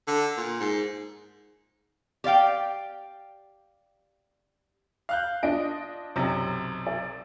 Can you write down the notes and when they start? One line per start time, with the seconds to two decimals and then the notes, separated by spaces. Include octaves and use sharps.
0.08 D3
0.37 A#2
0.60 G#2
2.24 G4 D5 F5 G5
5.09 F5 F#6 G6
5.43 D4 F4 D#5 D7
6.16 B1 F#2 C3
6.87 D5